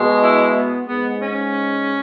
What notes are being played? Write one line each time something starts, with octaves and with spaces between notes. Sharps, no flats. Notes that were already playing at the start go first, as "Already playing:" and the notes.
Already playing: B2 G#3
E4
B3
G#2 G#3 B3
C#4